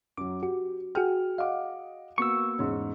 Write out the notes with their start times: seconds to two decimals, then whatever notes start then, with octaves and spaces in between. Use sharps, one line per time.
0.17 F#2 F#3 D6
0.43 F#4 G4
0.95 F#4 G#4 G5 F6
1.38 D#5 F5 F#5 D6
2.18 A#3 B3 F#4 C#6 E6
2.59 E2 G#2 C#4